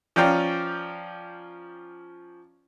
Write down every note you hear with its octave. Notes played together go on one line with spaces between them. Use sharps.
F3 C#4 D5 F5 G5 A#5